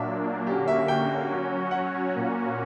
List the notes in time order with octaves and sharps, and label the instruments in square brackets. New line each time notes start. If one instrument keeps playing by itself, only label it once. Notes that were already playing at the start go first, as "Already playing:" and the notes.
Already playing: [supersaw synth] A#2 F#3 A#3 D4 [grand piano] E5
[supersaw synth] D3 A#3 C#4 F#4 [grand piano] G4
[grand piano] E5
G5
[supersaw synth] F#3 C#4 F#4 C#5
[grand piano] F#5
[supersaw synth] A#2 A#3 C#4 F#4